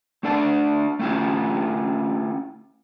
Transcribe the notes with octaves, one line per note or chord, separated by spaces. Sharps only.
A3 D4 A4 D5 A5
A3 C#4 E4 F4